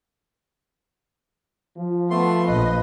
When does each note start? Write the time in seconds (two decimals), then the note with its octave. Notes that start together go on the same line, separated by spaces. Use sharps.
1.78 F3
2.11 A3 B3 C6
2.48 A#1 B4 D#5